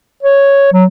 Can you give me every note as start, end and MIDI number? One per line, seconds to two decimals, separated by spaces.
0.23 0.70 73
0.73 0.85 54